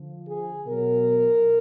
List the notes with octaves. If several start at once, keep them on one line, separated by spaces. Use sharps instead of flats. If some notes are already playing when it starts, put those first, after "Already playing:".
Already playing: D3 F3
G#4
B2 F#3 A#4